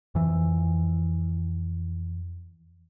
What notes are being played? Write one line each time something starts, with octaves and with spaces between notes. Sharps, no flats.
F2 E3